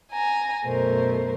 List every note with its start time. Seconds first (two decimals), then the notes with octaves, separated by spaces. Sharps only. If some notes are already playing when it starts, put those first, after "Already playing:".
0.11 G#5 A#5
0.65 F#2 B2 A3 A#4 C5